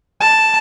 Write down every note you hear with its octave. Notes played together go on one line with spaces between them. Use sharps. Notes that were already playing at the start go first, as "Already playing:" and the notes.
A5